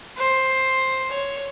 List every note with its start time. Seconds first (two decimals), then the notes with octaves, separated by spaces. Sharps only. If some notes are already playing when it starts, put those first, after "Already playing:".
0.17 C5
1.11 C#5